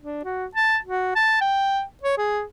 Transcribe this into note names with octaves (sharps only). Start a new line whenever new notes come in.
D4
F#4
A5
F#4
A5
G5
C#5
G#4